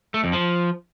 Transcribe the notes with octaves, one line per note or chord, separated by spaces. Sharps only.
A3
F2
F3